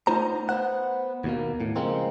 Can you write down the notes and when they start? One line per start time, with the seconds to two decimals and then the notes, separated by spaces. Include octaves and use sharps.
0.07 A3 B3 D#4 F4 C5 A#5
0.49 B3 C5 F#5
1.24 D#2 B2 A#3
1.60 A2
1.76 C#3 F3 G#3 A#3 C4